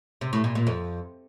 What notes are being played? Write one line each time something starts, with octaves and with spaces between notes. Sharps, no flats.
C3
A2
A#2
A#2
F2